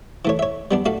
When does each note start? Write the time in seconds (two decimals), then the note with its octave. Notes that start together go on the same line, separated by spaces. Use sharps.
0.25 E3 A3 C#5
0.39 C#5 E5
0.71 G3 B3 D4
0.86 A3 F#4 F5